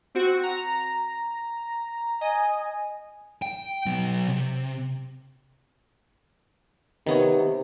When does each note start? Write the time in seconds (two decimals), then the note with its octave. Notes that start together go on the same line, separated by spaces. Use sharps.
0.15 C4 F#4
0.43 A#5
2.21 D#5 G#5
3.42 G5
3.86 B2 F#3
4.28 C3
7.07 C3 D#3 B3 C#5